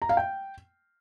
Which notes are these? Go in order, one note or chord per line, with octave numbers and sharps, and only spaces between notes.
A#5
F5
G5